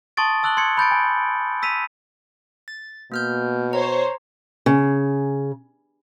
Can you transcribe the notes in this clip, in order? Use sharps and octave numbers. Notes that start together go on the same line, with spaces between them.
A5 C6 C#6 D#6 A6 D7
A5 E6 F#6 F#7 G7
C6 G#6 C#7
B5 G6 A6 D7
G#5
E6 B6 D#7 F7
A6
B2 A#3 F6 G6
C5 C#5 A#5
C#3